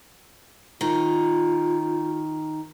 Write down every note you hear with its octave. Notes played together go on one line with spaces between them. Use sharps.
D#3 F4